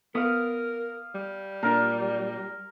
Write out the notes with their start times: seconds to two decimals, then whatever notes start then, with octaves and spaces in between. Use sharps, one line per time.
0.15 B3 A#4 F5 D6 D#6
1.15 G3
1.63 A#2 D4 A#4